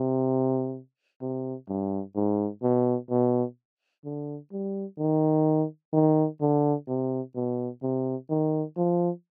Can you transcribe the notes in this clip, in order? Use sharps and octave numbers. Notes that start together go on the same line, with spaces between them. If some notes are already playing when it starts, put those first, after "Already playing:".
Already playing: C3
C3
G2
G#2
B2
B2
D3
G3
D#3
D#3
D3
C3
B2
C3
D#3
F3